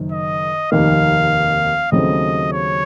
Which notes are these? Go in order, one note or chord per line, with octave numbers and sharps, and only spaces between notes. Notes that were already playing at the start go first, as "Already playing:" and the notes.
Already playing: F#1 F#2 D#3
D#5
F1 D#2 D#3 A#3 D#4 F5
D#2 C#3 F#3 A3 C4 D#5
C#5